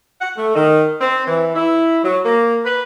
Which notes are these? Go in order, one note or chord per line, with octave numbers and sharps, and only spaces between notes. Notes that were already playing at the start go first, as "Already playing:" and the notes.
F#5
A3
D#3
C4
E3
E4
F#3
A#3
B4